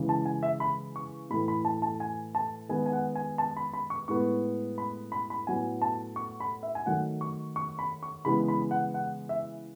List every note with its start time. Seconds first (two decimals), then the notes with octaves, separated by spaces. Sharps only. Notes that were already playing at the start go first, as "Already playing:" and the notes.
Already playing: C#3 E3 G#3
0.09 A5
0.25 G#5
0.43 E5
0.60 B5
0.96 C#6
1.30 A2 E3 A3 B5
1.48 B5
1.65 A5
1.82 A5
2.00 G#5
2.35 A5
2.69 D#3 G#3 B3 G#5
2.86 G#5
2.93 F#5
3.15 G#5
3.38 A5
3.57 B5
3.73 B5
3.90 C#6
4.08 A2 G#3 B3 C#6
4.78 B5
5.12 B5
5.30 B5
5.47 A2 F#3 B3 G#5
5.82 A5
6.16 C#6
6.40 B5
6.63 E5
6.75 G#5
6.86 D#3 F#3 A3 F#5
7.21 C#6
7.56 C#6
7.79 B5
8.03 C#6
8.25 C#3 E3 G#3 B3 B5
8.48 B5
8.71 F#5
8.94 F#5
9.29 E5